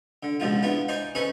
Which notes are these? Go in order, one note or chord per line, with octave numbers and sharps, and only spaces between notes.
D3
C#2 G#2 B2 F3 F4
B3 D4 E4 F4
D#4 C5 D5 G#5
C#4 D#4 G#4 A4 B4 C#5